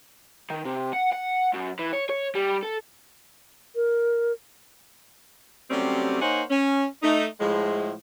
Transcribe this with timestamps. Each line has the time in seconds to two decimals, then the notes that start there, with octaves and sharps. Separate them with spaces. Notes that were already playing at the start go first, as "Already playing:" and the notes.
0.50 D#3
0.65 C3
0.93 F#5
1.12 F#5
1.53 F#2
1.79 E3
1.93 C#5
2.10 C#5
2.35 G3
2.63 A4
3.76 A#4
5.70 C3 F#3 G3 A3 C4 C#4
6.22 A#3 D#4 C5 C#5 F#5 G#5
6.50 C#4
7.03 A3 D#4
7.40 A2 F3 G#3